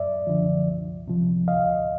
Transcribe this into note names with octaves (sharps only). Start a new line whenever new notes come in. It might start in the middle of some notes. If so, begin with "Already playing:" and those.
Already playing: F#2 D5 E5
D3 F3
C2
C3 F3
D2 D#5 F5